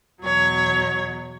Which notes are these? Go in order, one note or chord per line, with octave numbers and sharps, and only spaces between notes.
E2 B2 F#3 C#5